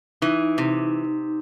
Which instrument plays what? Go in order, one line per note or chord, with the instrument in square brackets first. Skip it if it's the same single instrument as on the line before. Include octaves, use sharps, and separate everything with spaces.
[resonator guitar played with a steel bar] E3 [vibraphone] D#4
[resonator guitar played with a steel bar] C3